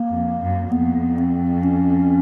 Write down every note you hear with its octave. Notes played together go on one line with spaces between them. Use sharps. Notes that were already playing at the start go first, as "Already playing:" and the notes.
Already playing: A#3
F2
F#2
F2 B3
C4
C#4